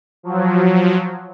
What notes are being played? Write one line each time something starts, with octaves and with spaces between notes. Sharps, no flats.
F3 F#3